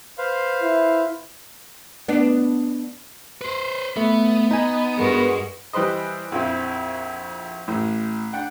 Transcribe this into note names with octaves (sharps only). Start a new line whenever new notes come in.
B4 C5 F5
E4
B3 D4
B4 C5
A3 B3
D#4 D#5 G#5
G2 G#3 F#4 G#4 A#4 B4
E3 G3 B4 C5 D#5
A#1 F2 C4 E4
A1 A2
D4 F#5 G5